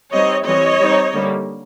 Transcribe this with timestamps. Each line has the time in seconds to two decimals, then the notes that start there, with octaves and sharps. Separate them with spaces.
0.13 G3 C4 D#4 C#5 D#5
0.46 E3 G3 C4 C#5 D#5
0.80 G3 C4 D#4
1.13 D3 G3 A#3